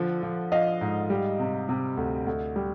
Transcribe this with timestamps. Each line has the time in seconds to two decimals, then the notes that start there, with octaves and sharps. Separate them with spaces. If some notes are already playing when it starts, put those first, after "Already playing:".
Already playing: D3 F3
0.23 F3
0.52 F3 D#5 F5
0.81 G#2
1.10 G3
1.40 C3
1.69 C3
1.97 D2
2.26 D2
2.56 G3